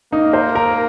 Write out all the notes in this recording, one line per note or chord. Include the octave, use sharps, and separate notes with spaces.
A#3 D#4
C5
A#4